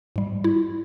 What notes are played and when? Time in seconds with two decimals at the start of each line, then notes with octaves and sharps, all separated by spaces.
0.16 G#2 G3
0.44 E4